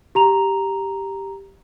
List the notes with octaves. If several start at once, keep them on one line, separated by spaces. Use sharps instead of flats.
G4 A#5 F7